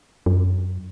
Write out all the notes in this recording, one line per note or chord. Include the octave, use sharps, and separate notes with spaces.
F#2